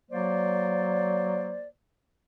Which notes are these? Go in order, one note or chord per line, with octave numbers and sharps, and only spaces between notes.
F#3 A#3 C5 D5